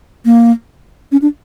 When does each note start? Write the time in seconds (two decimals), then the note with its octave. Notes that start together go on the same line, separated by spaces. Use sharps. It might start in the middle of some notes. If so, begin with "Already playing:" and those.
0.25 A#3
1.12 C#4
1.22 D4